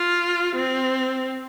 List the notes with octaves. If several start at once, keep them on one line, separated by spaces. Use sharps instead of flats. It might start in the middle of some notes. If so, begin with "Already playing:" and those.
Already playing: F4
C4